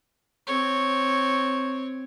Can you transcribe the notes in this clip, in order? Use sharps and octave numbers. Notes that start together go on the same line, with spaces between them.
C4 C#5